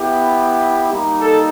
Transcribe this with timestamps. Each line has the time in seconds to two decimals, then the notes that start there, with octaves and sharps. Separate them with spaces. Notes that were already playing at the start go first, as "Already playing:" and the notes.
Already playing: B3 E4 G4
0.90 G3 A#3 D#4
1.20 A4